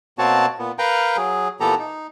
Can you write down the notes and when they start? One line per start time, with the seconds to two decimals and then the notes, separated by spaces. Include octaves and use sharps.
0.18 B2 A#3 C4 F#4 C#5 A5
0.59 A#2 B3
0.79 A#4 B4 F5 G5 A#5
1.17 F#3 G#4
1.60 A#2 E3 B3 G4 A4 A#5
1.78 D#4